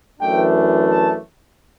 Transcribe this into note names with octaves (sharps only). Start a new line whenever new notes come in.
F#2 E3 A3 D4 G5
A5